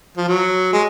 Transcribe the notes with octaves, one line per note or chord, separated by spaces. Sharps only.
F3
F#3
G#3